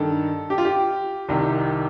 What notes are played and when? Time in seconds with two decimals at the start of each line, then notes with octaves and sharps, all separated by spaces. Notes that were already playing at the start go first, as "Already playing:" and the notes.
Already playing: G2 D#3 A4
0.50 G4
0.58 F4
0.65 G4
1.28 C2 C3 D#3